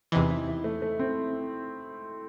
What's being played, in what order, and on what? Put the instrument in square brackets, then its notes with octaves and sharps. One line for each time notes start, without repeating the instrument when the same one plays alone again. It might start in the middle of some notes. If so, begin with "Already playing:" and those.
[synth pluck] E2 C3 E3 [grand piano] D#4
[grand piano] E4
E4
A3
A3
C4